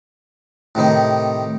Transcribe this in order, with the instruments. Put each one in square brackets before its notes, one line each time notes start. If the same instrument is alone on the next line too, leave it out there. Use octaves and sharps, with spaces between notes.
[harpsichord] A2 C3 D#3 D#4